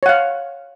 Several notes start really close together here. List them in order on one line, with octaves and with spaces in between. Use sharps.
C#5 F#5 F5